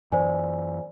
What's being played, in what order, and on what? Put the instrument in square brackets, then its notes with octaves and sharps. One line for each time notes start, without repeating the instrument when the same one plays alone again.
[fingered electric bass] F#2 E3 [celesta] C5 D5 G#5